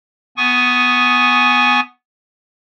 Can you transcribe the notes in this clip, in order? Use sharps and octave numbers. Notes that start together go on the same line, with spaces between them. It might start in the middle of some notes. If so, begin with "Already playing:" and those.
B3 G#5 C#6 D#6